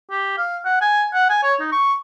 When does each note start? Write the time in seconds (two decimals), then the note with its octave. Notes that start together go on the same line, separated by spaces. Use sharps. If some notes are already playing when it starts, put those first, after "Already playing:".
0.11 G4
0.38 F5
0.65 F#5
0.81 G#5
1.14 F#5
1.30 G#5
1.43 C#5
1.61 D#4
1.72 C#6